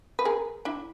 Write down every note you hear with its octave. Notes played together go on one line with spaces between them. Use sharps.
B4
G#4 A#4
D4 E4